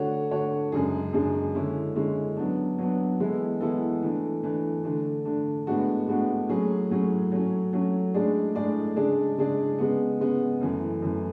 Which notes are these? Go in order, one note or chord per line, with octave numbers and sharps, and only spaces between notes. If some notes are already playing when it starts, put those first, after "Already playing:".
Already playing: D3 A3 D4 F#4 C#5
D3 A3 D4 F#4 C#5
F#2 C#3 G#3 D4 G#4
F#2 C#3 G#3 D4 G#4
D3 G#3 C#4 E4
D3 G#3 C#4 E4
F#3 B3 D4
F#3 B3 D4
E3 G#3 B3 E4 A4
E3 G#3 B3 E4 A4
E3 A3 D4
E3 A3 D4
D3 A3 D4
D3 A3 D4
A2 G#3 B3 D4 F#4
A2 G#3 B3 D4 F#4
A2 F#3 C#4 G#4
A2 F#3 C#4 G#4
F#3 A3 C#4
F#3 A3 C#4
A2 G#3 D4 G#4 D5
A2 G#3 D4 G#4 D5
C#3 G#3 D4 G#4 D5
C#3 G#3 D4 G#4 D5
C#3 G#3 B3
C#3 G#3 B3
F#2 E3 A3
F#2 E3 A3